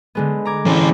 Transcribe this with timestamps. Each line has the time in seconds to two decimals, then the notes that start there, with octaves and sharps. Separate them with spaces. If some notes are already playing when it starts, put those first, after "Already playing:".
0.15 D3 G#3 B3
0.45 A#5 D6 G#6
0.66 E3 C4 C#4